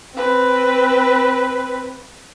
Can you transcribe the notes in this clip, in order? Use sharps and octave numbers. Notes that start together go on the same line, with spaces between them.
C4 B4